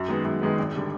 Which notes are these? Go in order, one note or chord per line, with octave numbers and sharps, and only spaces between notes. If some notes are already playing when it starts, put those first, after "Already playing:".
Already playing: F#2
D#3 G#3 B3
F#2
D#3 G#3 B3
G#1
D3 G3